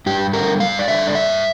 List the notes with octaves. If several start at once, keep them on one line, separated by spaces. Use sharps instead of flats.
G2 G4
D3 G3 A#4
G2 F5
D5
D3 G3 E5
D5
G2 E5